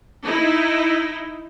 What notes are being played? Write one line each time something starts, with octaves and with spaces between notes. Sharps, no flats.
D#4 E4